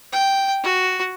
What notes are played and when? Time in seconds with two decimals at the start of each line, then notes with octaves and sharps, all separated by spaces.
0.12 G5
0.63 F#4